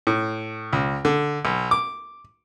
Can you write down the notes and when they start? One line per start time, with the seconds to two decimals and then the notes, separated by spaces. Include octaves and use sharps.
0.07 A2
0.73 C#2
1.05 D3
1.45 B1
1.71 D6